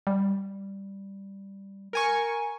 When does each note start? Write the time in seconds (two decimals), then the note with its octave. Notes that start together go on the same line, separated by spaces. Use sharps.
0.07 G3
1.93 A#4 G#5 C#6